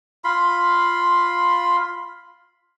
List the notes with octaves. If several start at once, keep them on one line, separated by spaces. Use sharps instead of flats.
F4 B5 C6